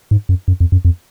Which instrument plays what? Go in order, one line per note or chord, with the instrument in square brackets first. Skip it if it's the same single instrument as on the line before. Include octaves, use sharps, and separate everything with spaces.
[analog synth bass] G#2
F#2
F#2
F2
F#2
F2